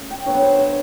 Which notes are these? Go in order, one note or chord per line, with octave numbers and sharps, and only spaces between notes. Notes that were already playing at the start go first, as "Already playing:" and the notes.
Already playing: A3 C#4
G5
D3 F#3 B3 D4 C#5
C5
C5
C#5